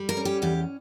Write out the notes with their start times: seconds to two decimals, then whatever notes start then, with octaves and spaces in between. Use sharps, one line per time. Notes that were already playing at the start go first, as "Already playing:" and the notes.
Already playing: G3
0.09 A#4
0.17 C#4
0.25 G4
0.42 E2 G4